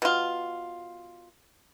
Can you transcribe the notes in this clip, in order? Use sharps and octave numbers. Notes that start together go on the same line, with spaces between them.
B2 F4